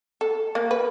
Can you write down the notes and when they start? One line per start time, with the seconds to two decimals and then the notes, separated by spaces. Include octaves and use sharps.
0.21 A4
0.55 A#3
0.71 B4